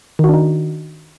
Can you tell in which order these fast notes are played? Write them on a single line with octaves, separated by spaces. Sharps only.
D#3 F#4 D4 D#4